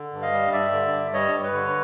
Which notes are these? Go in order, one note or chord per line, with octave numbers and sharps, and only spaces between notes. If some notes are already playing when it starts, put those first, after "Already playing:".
Already playing: D3
G2
D#5 F5
G3
G2 D5 E5
D3
G2
G3 C#5 D#5
G2
B4 C#5
D3